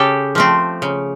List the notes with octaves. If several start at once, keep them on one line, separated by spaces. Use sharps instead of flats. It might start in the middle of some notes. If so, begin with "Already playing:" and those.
Already playing: C#3 G4 A4
F3 A3 C4
C#3